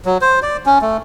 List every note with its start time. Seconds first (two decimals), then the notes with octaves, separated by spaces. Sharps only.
0.05 F#3
0.21 C5
0.42 D5
0.66 C#4
0.81 A3